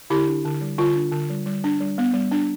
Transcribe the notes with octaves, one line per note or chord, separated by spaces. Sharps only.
D3 E4 G4
D4
D3
G3
D3 F4
D4
D3
G3
G3
D4
G3
B3
G3
D4